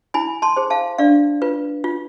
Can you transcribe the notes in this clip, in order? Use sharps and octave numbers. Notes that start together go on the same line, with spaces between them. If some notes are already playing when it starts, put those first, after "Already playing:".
E4 G#5 B5
A5 C6
G#4 C5
F5 A5
D4 D5 F5
F4 B4
F4